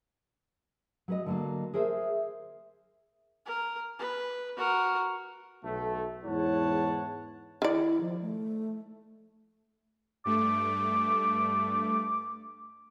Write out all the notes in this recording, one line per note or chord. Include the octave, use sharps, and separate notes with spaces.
F#3 B4 D#5
D3 F#3 A#3
G#4 A#4 C5 E5
A#4
B4
F#4 A#4
B1 A3
E2 G#2 E4 C#5 F#5 A5
D#3 E4 D5
F3
A3
G2 A3 D6